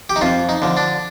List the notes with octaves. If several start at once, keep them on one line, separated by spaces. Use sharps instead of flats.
G4
D#4
F2 F4
D#4
D3 F3
D4